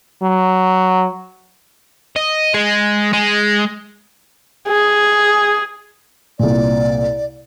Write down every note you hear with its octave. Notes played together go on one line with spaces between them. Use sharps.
F#3
D#5
G#3
G#3
G#4
C2 A#2 D5